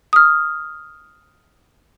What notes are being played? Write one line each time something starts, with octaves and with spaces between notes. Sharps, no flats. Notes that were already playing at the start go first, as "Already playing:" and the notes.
D#6 F6